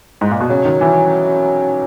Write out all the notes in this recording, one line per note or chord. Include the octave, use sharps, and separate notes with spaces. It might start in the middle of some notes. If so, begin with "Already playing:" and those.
G#2
A#2
B2
C#3 F#3
D#3
E3